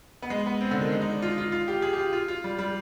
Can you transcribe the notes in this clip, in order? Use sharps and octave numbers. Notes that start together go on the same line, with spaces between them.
B3
G#3
B3
C4
D3
D#3
G#3
D#4
D4
F4
F4
F4
G4
G#4
G4
F4
F4
F4
G3
G3